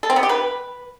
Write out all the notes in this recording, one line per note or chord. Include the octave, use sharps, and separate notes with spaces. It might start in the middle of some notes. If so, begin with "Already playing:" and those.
A4
C4
B3
G4
B4